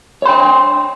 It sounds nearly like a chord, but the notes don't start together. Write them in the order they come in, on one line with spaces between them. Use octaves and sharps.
C#5 C6 G5